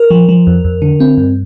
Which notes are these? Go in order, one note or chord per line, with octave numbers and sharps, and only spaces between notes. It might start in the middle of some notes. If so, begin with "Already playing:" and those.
Already playing: A#4
F3
F3
F2
F2
D3
C4
G2